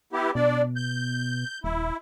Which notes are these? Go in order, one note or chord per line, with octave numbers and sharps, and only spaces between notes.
B3 E4 G4
B2 D4 D5
G6
D#1 E4